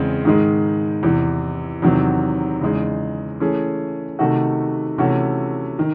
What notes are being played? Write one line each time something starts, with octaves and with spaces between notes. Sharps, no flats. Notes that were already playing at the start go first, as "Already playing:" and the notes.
Already playing: E2 C#3 G#3 C4
G#2 D#3 G#3
E2 C3 E3
E2 C3 D#3 F#3 C4
E2 C#3 G#3 D#4
E3 A3 C#4 G#4
C3 D#3 A3 D#4 F#4
C3 E3 A3 C#4 F#4
D#3